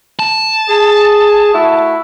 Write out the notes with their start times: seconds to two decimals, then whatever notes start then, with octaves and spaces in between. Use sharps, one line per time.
0.19 A5
0.67 G#4
1.53 A3 E4 F#4